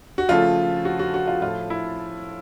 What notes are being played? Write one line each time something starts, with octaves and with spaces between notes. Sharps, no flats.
F#4
C#3 F3 A3 F4
F#4
F#4
F#4
F4
A2 F3 A3 F4
E4